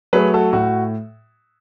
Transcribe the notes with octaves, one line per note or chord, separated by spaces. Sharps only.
F#3 A3 G#4 B4
F#4 A4
A2 F#4